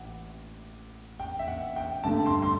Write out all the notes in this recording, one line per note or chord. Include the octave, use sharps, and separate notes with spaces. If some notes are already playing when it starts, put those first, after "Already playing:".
Already playing: A1 A2 F#5
G5
E5
F#5
G5
G2 D3 A3 A5
C6
C6